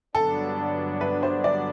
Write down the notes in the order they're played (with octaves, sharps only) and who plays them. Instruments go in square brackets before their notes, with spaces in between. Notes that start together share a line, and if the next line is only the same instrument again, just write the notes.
[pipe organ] G2 D3 F#3 B3 D4 [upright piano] A4
[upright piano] B4
C5
D5